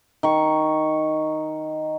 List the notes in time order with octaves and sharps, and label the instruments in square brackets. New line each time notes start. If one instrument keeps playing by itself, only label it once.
[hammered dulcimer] D#3 C#6